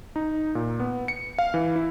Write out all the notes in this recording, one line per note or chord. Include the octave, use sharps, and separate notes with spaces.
D#4
A#2
B3
C#7
F5
E3
E4